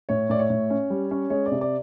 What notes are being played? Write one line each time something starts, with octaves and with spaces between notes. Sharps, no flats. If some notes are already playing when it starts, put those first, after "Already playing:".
A2 C#5
A2 D5
C#5
A2
C#4
G3
C#4
G#3 C#5
D5
C3
D5